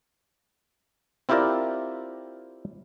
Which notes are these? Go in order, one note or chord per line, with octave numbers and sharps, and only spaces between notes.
C4 E4 F4 G4 A#4 D5